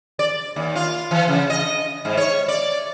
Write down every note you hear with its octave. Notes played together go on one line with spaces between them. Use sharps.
D5
D#2
F4
E3
C#3
D#5
G#2
C#5
D5